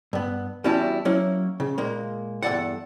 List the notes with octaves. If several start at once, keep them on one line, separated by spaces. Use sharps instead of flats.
G2 B3
E2 G3 C#4 E4 F#4 A5
F#3 A#3 C#4 E4
C#3
A#2 G#3 A#3
E2 G2 F#3 A4 D5 F#5